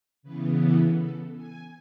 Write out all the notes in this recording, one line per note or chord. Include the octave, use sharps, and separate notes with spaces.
C#3 E3 B3 B4
A4
A4
G#5